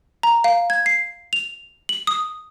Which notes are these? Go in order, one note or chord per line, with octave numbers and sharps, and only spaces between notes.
A#5
F5
G#6
C7
F7
F#7
D#6